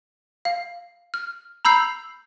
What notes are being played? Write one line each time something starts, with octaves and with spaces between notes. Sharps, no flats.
F5
F6
A#5 B5 E6 G6 C7